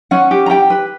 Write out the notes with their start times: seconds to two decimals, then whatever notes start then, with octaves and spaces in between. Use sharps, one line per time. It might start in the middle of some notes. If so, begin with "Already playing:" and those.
0.11 C#4 F#5
0.31 G4
0.46 A#5
0.50 G4 G5
0.70 B4